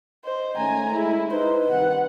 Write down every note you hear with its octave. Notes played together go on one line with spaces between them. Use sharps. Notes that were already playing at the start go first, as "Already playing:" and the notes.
C5 D#5
G#2 D#3 A3 C#4 G#5 A#5
G#3 E4
D#4 B4 C5
G2 C3 D#3 F#5